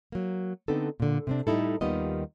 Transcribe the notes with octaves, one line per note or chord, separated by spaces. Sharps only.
F#3 A#3
D3 B3 C4 D4 D#4 A4
A#2 D3
C3 C4 D4
A2 G3 D#4 E4 A4
D#2 D#3 G3 B3 F4 D#5